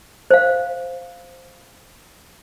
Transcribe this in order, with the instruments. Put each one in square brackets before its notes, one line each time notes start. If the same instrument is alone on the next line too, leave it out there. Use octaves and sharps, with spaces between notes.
[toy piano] C5 F5